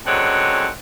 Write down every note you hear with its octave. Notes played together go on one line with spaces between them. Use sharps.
F#2 D3 G#3 C4 C#5 F#5